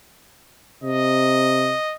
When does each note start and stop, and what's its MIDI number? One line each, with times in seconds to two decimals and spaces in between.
0.83 1.74 48
0.83 1.96 75